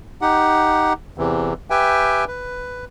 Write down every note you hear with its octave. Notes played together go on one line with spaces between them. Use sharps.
D#4 G4 F#5
E2 C3 E3
G4 B4 E5 G5 G#5
B4